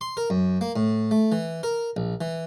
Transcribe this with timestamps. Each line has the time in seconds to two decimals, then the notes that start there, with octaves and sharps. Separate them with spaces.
0.01 C6
0.17 A#4
0.30 F#2
0.61 A#3
0.76 A2
1.11 A3
1.32 E3
1.63 A#4
1.97 A#1
2.21 E3